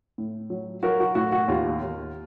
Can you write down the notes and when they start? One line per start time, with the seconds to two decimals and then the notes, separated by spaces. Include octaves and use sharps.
0.18 A2
0.50 F#3
0.83 F#3 F#4 A#4
1.00 F#4
1.15 A2 F#4
1.32 F#4
1.48 D#2 F4
1.82 D#2